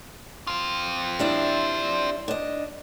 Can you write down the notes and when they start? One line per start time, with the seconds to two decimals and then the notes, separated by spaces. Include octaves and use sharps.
0.47 C4 F4
1.19 G3 D4 E4
2.28 D4 D#5